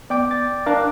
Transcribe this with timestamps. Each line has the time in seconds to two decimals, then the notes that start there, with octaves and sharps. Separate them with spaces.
0.10 B3 D5 G5 D6
0.31 A6
0.66 D4 A#4 F5 D6 F#6